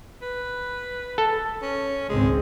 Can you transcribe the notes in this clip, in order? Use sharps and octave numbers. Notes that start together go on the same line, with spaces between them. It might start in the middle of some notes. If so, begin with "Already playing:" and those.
B4
A4
C#4
G#1 C#2 G#3 C4